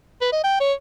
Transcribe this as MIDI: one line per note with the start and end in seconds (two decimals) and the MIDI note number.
0.21 0.31 71
0.33 0.40 75
0.44 0.60 79
0.61 0.74 73